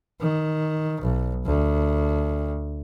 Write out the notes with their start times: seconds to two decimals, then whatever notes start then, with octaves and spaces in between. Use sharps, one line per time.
0.21 D#3
1.01 B1
1.45 D2